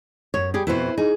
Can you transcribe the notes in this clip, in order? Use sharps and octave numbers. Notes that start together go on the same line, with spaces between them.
F#2 C#5
G3 G4 G#4
F2 B2 E4 B4 C5
D#4 G#4